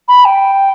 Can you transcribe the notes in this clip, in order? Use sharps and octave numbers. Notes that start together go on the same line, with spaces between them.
B5
G5